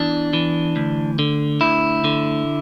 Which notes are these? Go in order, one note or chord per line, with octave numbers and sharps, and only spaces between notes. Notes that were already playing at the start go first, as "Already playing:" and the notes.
Already playing: E2 E3 D4
E3
D2
D3
D2 E4
D3